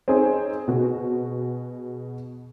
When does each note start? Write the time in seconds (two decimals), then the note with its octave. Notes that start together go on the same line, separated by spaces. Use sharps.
0.08 C4 C#4 D#4 G#4 C#5
0.68 B2 F#4 G#4